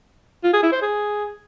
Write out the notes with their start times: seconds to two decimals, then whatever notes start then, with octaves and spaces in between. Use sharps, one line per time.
0.44 F4
0.53 G#4
0.63 E4
0.72 C5
0.82 G#4